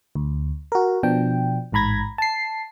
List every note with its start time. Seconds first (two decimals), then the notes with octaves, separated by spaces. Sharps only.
0.15 D2
0.72 F#4 A#4
1.03 B2 F3 D4 G5
1.72 A1 G#2 A#5 B5 G#6 A#6
2.18 A5 C7